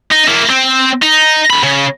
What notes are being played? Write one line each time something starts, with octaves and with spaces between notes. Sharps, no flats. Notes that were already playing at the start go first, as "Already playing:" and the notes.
D#4
A#3 E4
C4
D#4
D3 B5
C#3